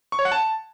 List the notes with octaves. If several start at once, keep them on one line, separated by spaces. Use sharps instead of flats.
C#6
C#5
F#5
A5